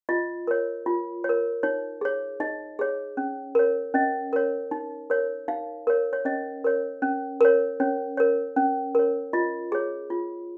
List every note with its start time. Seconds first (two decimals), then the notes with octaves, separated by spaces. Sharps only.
0.09 F4 D#5
0.47 A#4 C#5
0.86 F4
1.24 A#4 C#5
1.63 D#4 C#5
2.01 G#4 C#5
2.40 D#4 D#5
2.79 G#4 C#5
3.17 C#4
3.55 A#4 C#5
3.94 C#4 D#5
4.33 A#4 C#5
4.71 D#4
5.10 A#4 C#5
5.48 D#4 F5
5.87 A#4 C#5
6.13 C#5
6.25 C#4 D#5
6.64 A#4 C#5
7.02 C#4
7.41 A#4 C#5
7.80 C#4 C#5
8.17 A#4 C#5
8.56 C#4
8.95 A#4 C#5
9.33 F4 D#5
9.72 G#4 C#5
10.10 F4